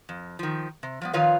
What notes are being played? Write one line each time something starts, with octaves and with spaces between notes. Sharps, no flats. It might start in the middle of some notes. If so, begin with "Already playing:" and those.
F2
D#3 F3
C3
F3 G3 B3
D#3 F3 F4 B4 C#5 F5